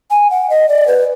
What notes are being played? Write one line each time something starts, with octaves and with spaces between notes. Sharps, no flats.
G#5
F#5
D#5
D5
B4